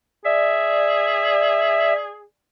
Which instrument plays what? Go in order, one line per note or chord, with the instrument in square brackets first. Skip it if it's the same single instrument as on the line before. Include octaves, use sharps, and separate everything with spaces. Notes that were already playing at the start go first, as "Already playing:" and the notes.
[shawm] G#4 [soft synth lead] D5 [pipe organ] E5